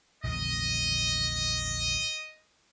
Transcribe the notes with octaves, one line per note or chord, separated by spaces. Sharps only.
A#1 E2 D3 D#5